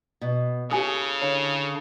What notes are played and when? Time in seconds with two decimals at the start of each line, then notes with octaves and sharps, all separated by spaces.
0.21 B2
0.71 C#3 E4 G4 A4 G#5 D#6
1.22 D3 D4 C#5 F5